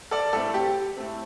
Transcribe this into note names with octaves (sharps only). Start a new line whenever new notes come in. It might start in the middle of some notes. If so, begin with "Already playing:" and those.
A4 D5
A2 A3 C4 A4
G4
A2 A3 C4